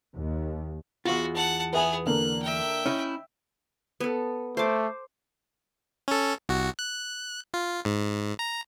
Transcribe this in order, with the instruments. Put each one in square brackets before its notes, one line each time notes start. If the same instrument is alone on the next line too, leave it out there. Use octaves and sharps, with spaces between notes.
[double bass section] D#2
[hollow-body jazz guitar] E2 F4 [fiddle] F#4
[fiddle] F#5 A5
[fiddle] B3 G#4 [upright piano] B4 E5 G#5
[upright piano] D3 A#3 [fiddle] F#6
[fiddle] E5 G5
[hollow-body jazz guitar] C#4 D#4 E4
[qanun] B3 A4
[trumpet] A3 [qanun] C5 D6
[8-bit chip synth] C#4 A4
C2 F#4
F#6
F4
G#2
A#5